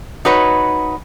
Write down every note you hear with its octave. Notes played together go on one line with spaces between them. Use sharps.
D#4 F#4 B4 C#5